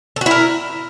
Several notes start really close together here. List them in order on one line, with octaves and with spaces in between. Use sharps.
A4 F#4 E4 A#4